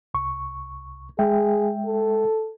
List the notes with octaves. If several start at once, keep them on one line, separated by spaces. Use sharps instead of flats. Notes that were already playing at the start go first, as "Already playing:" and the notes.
C2 C#6
G#3 G#4 E5 G5
A4